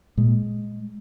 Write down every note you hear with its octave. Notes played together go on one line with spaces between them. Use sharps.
A#2 G#3